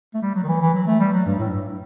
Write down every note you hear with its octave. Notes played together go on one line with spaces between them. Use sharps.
A3
G3
F#3
D#3
E3
E3
F#3
A3
G3
F#3
G2
A2
G2